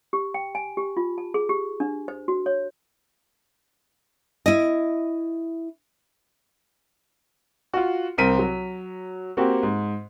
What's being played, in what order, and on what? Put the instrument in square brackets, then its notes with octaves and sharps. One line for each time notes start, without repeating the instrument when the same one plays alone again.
[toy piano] G4
G5
G#5
G4
F4
A5
G#4
G4
D4
C5
F#4
C#5
[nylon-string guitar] E4 D#5
[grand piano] F4 F#4
C2 C4 A#4 B6 D#7
F#3
A#3 C4 F#4 G4
G#2